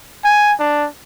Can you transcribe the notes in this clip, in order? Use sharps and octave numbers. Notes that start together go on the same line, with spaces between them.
G#5
D4